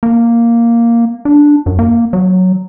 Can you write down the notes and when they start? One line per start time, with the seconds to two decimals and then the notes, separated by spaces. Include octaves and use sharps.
0.03 A#3
1.25 D4
1.66 F#2
1.79 A#3
2.13 F#3